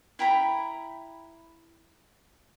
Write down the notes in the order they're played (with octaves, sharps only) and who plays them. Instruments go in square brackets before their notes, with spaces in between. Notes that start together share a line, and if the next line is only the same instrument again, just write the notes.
[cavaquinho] E4 G5 A#5 B5